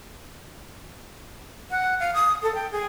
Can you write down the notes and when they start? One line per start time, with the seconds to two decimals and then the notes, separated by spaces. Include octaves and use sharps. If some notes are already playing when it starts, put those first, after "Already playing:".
1.71 F#5
2.00 F5
2.14 D#6
2.43 A4
2.55 G5
2.72 G#4